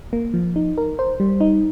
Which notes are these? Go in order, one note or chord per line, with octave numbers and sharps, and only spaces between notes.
A#3
F3
D#4
A#4
C5
G3
D#4